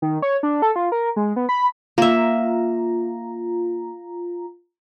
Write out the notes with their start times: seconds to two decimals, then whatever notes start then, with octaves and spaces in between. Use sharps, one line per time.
0.02 D#3
0.22 C#5
0.43 D4
0.62 A4
0.76 F4
0.92 A#4
1.16 G#3
1.36 B3
1.49 B5
1.98 A#3 F4 E5 A#5